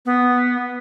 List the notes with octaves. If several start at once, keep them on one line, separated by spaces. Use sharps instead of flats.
B3